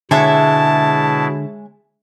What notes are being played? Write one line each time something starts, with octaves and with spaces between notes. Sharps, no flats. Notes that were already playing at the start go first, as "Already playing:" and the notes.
B2 D3 G#3 E4 C#5 E5 A5